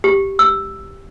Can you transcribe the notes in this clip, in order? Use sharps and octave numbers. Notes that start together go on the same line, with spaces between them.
G4
E6